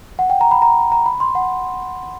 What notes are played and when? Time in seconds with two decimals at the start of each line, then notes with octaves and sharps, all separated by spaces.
0.19 F#5
0.30 G5
0.41 A#5
0.51 B5
0.62 A#5
0.92 A#5
1.06 B5
1.20 C6
1.35 F#5